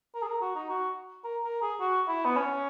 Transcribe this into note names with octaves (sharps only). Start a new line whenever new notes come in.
A#4
G#4
A#4
F#4
D#4
F#4
A#4
A#4
G#4
F#4
E4
B3
C#4